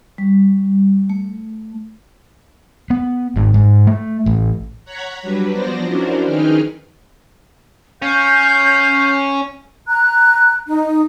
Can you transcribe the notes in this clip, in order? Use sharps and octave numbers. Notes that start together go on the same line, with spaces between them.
G3
A3
B3
G#1
G#2
A3
A1
C#5 F#5 A#5 F#6 G#6 B6
F#3 G3 D4 B4
F3 F#3 B3 C5 D5 A#6
C#4 D4 E4 F#4 A#4 C5
D#3 D#4 G#4 B4 G5 F6
C#4 F5 G6
A#5 F#6
D#4